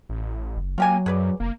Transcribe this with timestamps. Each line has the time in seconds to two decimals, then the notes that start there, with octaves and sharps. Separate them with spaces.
0.09 A1
0.57 F#1
0.78 F#3 A#3 F4 G4 G#5
1.06 F#2 G#4 B4 D5
1.40 F1 A#3